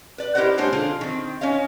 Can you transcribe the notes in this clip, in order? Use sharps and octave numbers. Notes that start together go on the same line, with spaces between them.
B4 D5
E4 G4 A#4 C5 D#5 F#5
G#3 A#3 D4 G4 C5 C#5
D3 F3 F4 G#4
D#3 C4
C#4 C#5 D#5 F5